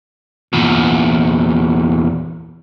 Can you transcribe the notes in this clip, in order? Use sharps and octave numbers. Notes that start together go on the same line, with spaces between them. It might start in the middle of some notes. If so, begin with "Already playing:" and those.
E2 A#2